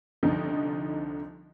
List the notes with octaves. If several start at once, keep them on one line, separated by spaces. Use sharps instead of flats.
C2 D3 F3 D4 D#4